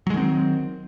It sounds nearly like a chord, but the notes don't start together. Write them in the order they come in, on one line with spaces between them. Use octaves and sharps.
F#3 G#3 D#3 C4